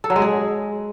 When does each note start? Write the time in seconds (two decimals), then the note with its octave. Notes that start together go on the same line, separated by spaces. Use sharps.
0.04 A4
0.10 F#3
0.16 G#3
0.22 G#4